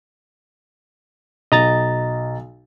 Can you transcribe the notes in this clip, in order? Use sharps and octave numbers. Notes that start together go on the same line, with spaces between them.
B1 D#5 A#5 A6